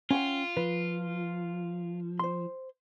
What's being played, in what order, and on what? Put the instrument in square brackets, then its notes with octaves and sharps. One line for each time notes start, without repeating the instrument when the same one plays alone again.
[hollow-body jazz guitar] C#4 F#5 G5 [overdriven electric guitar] F4
[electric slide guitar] F3 [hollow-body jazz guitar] B4
[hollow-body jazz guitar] C5 C6